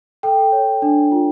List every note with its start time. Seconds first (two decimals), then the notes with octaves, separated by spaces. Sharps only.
0.23 A4 G5
0.52 C#5
0.82 D4
1.12 F4